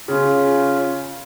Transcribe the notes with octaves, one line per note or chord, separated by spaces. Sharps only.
C#3 C#4 F4